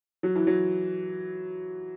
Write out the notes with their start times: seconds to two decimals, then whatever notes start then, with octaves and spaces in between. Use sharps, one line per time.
0.23 F#3
0.35 E3
0.47 F#3